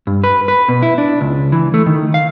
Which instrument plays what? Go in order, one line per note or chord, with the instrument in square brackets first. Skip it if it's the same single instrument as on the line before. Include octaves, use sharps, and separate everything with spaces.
[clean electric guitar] G2
B4
B4
B2
E4
D4
C#2
E3
A3
D#3
F5